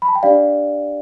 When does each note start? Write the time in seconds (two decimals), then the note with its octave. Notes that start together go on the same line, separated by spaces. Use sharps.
0.02 B5
0.08 A5
0.15 G5
0.23 D4 G4 D5 F5